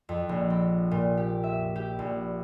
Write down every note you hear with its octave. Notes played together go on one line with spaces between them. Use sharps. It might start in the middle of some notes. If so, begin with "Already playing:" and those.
F2
A#1
C4
A#2
G4
E5
G4
A#1